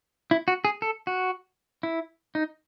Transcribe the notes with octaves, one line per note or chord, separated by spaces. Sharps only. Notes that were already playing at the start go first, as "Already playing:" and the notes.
E4
F#4
G#4
A4
F#4
E4
D#4